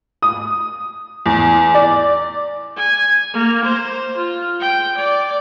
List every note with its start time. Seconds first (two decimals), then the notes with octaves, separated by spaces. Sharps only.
0.22 D#6
1.26 E2
1.74 D5
2.77 G#5
3.34 A#3
3.65 C5
4.17 F4
4.61 G5
4.97 D5